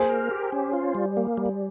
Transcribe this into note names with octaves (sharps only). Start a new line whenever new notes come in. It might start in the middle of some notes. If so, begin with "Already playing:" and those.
Already playing: A#3 G#4 C5
A#4
G4
C#4
F4
G3
A#3
G3